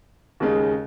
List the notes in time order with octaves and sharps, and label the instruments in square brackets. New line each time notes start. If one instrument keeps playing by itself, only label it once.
[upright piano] D#2 C#3 G#3